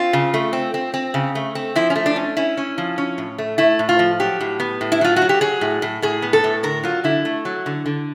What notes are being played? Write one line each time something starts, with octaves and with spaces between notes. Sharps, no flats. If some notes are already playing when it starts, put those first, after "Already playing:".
Already playing: C4 F4
C#3
A3
C4
C4
C4
C#3
A3
C4
F3 E4
C#4
A3
D4
C#4
C#4 E4
C#4
F3
C#4
A2
A3
A3 E4
A2
F4
F3
F#3 G4
A2
B3
A2
E4
F#3 F4
F#4
F#3
G4
F#3 G#4
A2
A2
A2 G#4
B3
A4
A2
D3 A#4
F#3 F4
D3 E4
A3
F#3
D3
D3